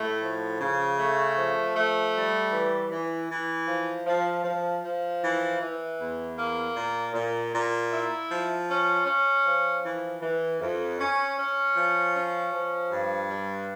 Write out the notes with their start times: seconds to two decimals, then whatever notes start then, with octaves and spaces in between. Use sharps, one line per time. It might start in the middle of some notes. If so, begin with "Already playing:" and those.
Already playing: A2 A3
0.22 F3
0.61 C#3
0.98 A3
1.37 F3
1.76 A3
2.14 G3
2.52 E3
2.90 E3
3.29 E3
3.68 F3
4.07 F3
4.44 F3
4.83 F3
5.22 E3
5.60 E3
5.99 E2
6.37 A#3
6.75 A#2
7.13 A#2
7.53 A#2
7.91 E4
8.29 F3
8.68 C#4
9.06 C#4
9.45 F3
9.83 E3
10.21 E3
10.61 F2
10.98 C#4
11.38 C#4
11.75 F3
12.14 C#4
12.52 F3
12.91 G2
13.29 G3